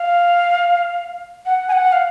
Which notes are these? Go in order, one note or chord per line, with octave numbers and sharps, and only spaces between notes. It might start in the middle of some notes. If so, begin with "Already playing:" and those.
Already playing: F5
F#5
G#5
F#5
F5